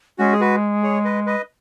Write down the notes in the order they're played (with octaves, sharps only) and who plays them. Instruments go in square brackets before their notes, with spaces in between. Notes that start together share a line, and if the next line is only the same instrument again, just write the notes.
[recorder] G#3 [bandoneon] C#4 F#4
[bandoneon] G#4
F#4 B4
G#4 C#5
B4 D#5
B4 D#5